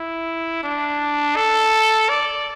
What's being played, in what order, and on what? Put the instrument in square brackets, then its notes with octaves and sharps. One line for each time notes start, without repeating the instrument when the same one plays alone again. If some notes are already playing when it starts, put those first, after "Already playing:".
Already playing: [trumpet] E4
D4
A4
D5